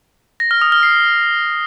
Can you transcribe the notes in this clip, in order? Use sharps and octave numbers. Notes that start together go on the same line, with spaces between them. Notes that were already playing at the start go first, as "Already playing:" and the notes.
A#6
F6
D#6
F6
C7